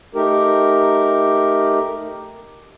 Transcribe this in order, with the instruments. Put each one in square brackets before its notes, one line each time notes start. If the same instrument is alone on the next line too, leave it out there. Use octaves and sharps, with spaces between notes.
[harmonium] A3 D#4 G4 A#4